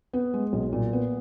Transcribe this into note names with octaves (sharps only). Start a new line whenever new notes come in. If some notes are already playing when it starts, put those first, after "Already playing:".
B3
G#3
B1
A#2
B3